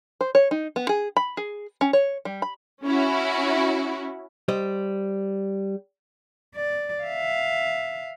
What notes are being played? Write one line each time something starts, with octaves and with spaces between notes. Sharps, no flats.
C5
C#5
D#4
B3
G#4
B5
G#4
C#4
C#5
G3
B5
C#4 E4 F#4
G3 C5 D#5
D5
E5 F5